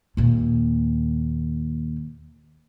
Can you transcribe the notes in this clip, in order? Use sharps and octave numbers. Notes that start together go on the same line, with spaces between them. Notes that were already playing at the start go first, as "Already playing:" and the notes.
D#2 A#2